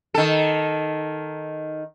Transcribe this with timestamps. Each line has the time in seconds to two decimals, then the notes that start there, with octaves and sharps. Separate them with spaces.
0.14 D#3 A4